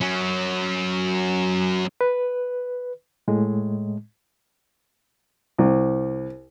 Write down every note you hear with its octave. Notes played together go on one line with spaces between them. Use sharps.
F#3 C#4
B4
A2 G#3
C2